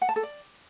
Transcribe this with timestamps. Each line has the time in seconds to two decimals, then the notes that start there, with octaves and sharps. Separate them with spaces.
0.02 F#5
0.09 A5
0.16 A4
0.23 D5